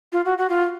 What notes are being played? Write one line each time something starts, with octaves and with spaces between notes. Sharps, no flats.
F4
F#4
F#4
F4